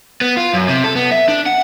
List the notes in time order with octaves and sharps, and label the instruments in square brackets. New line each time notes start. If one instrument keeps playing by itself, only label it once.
[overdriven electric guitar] B3
F4
F#2
C3
A4
B3
E5
D4
F#5